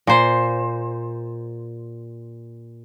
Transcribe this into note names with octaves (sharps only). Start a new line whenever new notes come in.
A#2 C5